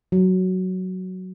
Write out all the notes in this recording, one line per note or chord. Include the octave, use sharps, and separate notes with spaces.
F#3